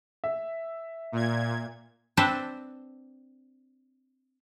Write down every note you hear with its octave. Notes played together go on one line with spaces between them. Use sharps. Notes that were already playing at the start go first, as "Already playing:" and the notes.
E5
A#2 G#6
C4 D4 A4 B4 C5